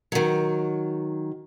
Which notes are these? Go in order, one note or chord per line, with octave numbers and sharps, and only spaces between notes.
D#3 F#3